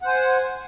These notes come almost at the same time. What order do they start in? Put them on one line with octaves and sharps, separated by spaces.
F#5 C5 G#5